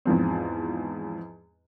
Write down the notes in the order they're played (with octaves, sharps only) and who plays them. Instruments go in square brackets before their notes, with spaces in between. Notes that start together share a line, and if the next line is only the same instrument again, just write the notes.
[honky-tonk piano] E2 G#2 F3 C4